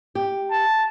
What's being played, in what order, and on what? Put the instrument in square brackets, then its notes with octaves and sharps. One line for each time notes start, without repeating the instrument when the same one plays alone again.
[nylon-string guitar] G4
[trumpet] A5